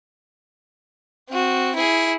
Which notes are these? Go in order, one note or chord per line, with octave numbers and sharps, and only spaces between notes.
C4 F#4
E4 G#4